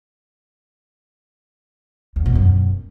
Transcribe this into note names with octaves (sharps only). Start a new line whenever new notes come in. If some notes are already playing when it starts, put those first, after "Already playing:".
E2
B2
F#2